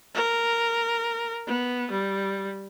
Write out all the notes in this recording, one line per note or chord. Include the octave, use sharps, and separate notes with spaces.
A#4
B3
G3